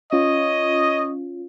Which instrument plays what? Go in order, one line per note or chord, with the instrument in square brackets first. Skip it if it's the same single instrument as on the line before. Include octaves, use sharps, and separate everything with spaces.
[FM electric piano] C#4 F4 [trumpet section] C#5 D#5